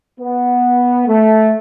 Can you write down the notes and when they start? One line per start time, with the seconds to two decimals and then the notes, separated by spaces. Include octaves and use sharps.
0.20 B3
1.07 A3